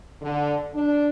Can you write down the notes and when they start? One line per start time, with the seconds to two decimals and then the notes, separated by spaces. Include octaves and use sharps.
0.21 D3
0.74 D4